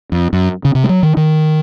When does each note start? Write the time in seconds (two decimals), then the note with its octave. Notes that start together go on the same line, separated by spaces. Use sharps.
0.12 F2
0.33 F#2
0.65 C#3
0.75 C3
0.84 G#3
0.89 F#3
1.03 D#3
1.17 D#3